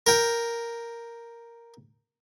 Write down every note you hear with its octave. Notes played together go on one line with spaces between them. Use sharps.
A#4 G5